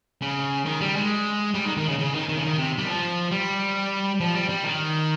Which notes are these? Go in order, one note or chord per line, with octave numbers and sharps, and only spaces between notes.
C#3
D#3
G3
G#3
G3
D#3
D#3
C#3
C#3
D#3
D#3
C#3
D#3
C3
G3
F3
G3
F3
G3
G3
D#3